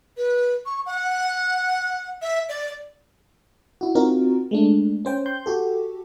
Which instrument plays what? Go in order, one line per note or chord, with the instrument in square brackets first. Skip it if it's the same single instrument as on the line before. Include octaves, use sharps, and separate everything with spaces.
[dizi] B4
C#6
F#5
E5
D5
[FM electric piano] E4 F#4
C4 D#4 F4 F#4 A#4
G#3 A3 D4
C#4 C5 G5
C6 G6
F#4 G4 A4